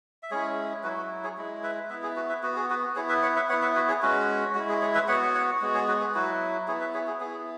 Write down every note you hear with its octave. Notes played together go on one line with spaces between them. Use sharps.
E5
G#3 C#4 E4 G#4 C#5
F#3 E4 F#4 B4
F#4
G#4 C#5
G#3 E4
B4 E5
B3 E4 B4 E5
G#4
F#4 B4
B4 E5
B3 F#4 B4
G#4
F#4 B4
B3 E4 G#4 C#5
B4 E5
C#5 F#5
B4 E5
B3 E4 C#5 F#5
B4 E5
F#4 B4
G#4 C#5
G#3 C#4 F#4 B4
G#3 E4 F#4
G#4
G#4 C#5
B4 E5
B3 F#4 C#5 F#5
C#5 F#5
G#3 B3 F#4
G#4 C#5
F#4 B4
G#4
F#3 E4 F#4 B4
B3 E4 G#4 C#5
B4 E5
G#4 C#5
G#4
B3 E4 G#4